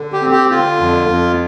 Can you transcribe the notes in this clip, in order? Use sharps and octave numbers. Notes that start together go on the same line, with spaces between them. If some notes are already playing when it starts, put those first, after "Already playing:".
Already playing: D3
G4
C4
G4
D3 F4
F2
F2